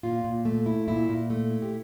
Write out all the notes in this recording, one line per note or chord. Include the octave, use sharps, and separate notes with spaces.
A#2 F4
A#2
A3
E4
A#2 E4
A#2
A3
E4
G4